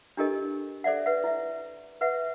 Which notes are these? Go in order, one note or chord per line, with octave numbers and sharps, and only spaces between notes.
D4 E4 G4 A4 A#4 D#5
A4 C5 D5 E5 F#5
B4 E5 F#5
E4 E5
B4 E5 F#5